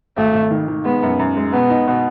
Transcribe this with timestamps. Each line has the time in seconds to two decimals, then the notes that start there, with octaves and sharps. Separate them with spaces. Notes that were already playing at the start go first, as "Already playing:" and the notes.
0.17 G#1 A3
0.34 G#1
0.51 D#3
0.68 D#3
0.85 G#3 B3
1.03 F#2
1.19 F#2
1.37 G#3
1.53 B2 B3
1.70 D#4
1.88 B2